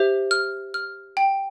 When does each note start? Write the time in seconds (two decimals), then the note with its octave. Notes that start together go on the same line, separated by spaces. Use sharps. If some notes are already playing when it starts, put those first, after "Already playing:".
Already playing: G4 C5 E5
0.31 F6
0.74 F6
1.17 G5